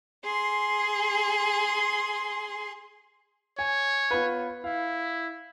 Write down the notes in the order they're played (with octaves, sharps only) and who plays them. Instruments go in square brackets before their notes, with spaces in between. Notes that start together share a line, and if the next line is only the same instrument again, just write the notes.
[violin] G#4 C6
[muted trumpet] C#5 [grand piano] G#5
[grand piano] B3 F4 B4
[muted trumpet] E4 [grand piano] F5